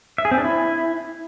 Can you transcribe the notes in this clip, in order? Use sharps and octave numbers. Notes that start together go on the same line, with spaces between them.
E5
G#4
C4
D4
E4